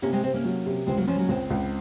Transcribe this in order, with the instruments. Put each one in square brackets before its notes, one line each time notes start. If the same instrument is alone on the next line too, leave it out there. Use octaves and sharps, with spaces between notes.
[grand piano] C3 [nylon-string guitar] A#3 C#4
[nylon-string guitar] G#3 C4
[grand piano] C3 [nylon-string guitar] C4
[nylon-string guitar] A#3 C#4
[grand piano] F#3
C3
[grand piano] C#2 [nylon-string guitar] G#3 C4
[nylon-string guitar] F#3 A#3
[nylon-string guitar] F3 G#3 [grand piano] C#4
[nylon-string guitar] F#3 A#3
[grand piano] C#2 [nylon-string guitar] G#3 C4
[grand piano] C#2